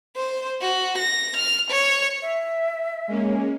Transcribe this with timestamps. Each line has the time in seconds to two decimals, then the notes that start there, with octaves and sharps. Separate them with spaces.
0.16 C5
0.61 F#4
0.98 A#6
1.37 F6
1.71 C#5
2.22 E5
3.08 G#3 A#3 C#4